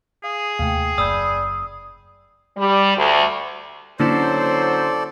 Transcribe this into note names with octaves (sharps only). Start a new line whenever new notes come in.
G#4 F5
D#2 C3 A3 F5 G5
F#1 D5 B5 D#6 E6 G6
G3
D2
D3 F#3 A#3 C#4 E4 A4 C5 D5